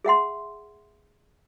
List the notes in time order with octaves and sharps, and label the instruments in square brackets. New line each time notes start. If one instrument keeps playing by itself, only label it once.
[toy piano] G#4 E5 F#5 C6